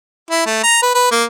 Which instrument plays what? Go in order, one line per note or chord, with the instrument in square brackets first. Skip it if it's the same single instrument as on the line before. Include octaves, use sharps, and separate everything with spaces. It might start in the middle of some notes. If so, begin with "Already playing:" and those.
[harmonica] E4
A3
A#5
B4
B4
A#3